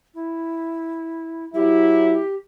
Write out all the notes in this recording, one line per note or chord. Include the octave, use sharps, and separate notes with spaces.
E4
F#3 E4 G4